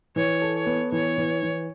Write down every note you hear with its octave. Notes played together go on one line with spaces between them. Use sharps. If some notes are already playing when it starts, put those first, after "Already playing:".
E3 C#5
A4
C#5
B3
E3 C#5
E3
E3